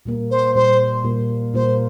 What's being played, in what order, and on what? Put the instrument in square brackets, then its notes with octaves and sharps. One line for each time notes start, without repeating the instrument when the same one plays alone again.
[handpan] A#2 G3 A#3
[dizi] C5
[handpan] A#2 G3 A#3 [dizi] C5
[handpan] A#2 G3 A#3
[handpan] A#2 G3 A#3 [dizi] C5